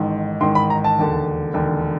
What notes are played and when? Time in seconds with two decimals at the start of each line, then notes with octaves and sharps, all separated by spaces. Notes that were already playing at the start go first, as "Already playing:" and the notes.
Already playing: A1 G#2 D#3
0.41 A1 G#2 D#3 C6
0.55 B5
0.70 A#5
0.84 A5
0.99 E1 D#2 D3
1.54 E1 D#2 D3